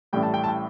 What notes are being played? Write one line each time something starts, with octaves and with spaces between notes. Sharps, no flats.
A1 A2 G3 G5
A5
G5
A5
G5